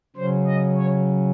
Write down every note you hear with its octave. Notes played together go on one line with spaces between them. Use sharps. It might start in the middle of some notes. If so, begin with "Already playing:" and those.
C#3 F#3 C#4 C5
D#5
C#5